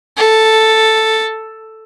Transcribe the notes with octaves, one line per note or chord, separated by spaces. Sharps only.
A4